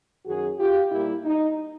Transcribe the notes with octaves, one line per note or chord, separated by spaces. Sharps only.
F#2 D#3 F#3 F#4 G#4
F4 G4
A#2 G3 A#3 E4
D#4